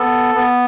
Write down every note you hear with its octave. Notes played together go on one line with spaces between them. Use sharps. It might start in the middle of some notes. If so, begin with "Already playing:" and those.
Already playing: B3 A4
B3